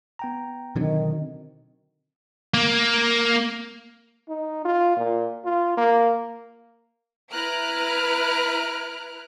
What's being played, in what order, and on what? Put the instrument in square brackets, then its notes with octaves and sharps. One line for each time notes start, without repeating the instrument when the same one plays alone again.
[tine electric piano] B3 G5 A#5
[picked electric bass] B2 D3 F#3 [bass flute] D#3 [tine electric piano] C4
[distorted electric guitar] A#3
[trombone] D#4
F4
A#2
F4
A#3
[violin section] E4 B4 A#5 F6 F#6 D7